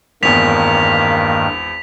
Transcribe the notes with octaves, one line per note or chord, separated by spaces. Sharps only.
G#1 E2 G2 D#3 A#3 B6 F7